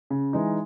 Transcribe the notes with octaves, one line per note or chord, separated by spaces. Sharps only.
C#3
E3 G#3 D#4